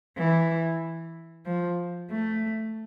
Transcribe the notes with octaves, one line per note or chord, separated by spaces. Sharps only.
E3
F3
A3